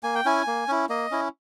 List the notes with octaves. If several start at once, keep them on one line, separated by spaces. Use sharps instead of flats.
A#3 G#5
G5
C#4 E4 G#5
A#3
C#4 E4
A#3 D#5
C#4 E4